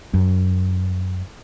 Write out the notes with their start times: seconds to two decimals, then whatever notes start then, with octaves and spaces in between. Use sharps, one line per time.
0.14 F#2